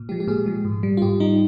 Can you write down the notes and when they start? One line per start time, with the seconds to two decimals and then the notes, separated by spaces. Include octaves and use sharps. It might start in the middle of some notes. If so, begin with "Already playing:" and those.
Already playing: A#2
0.09 F3 G#3 G4
0.20 G4
0.27 A#2 G#4
0.46 F3 G#3
0.65 G#2
0.83 G3
0.97 F4
1.02 G#2 G4
1.20 G3 D#4